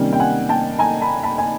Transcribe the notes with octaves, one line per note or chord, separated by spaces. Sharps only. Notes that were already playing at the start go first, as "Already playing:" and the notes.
Already playing: C3 D#3 G3 A#3 C#4
G5
F#5 G#5
G5 A5
G#5 A#5
A5 B5
A5 B5
G#5